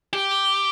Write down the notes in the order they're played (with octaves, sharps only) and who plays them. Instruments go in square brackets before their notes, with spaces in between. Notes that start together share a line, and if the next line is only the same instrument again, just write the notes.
[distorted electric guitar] G4